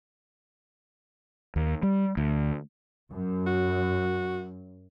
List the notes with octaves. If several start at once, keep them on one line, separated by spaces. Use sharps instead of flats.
D#2
G3
D2
F#2
F#4